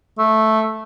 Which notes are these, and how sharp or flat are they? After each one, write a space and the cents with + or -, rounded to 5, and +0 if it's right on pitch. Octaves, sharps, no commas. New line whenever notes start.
A3 -5